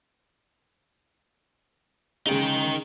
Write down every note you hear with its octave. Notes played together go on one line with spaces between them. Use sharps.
C#3 G#3 D#4 G5